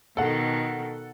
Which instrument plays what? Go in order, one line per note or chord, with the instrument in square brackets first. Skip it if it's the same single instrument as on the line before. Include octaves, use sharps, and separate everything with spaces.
[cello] B2 D#3 [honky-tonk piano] A4 F#5